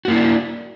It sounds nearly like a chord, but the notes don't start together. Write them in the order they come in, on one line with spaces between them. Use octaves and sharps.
F#4 A#3 E4 D4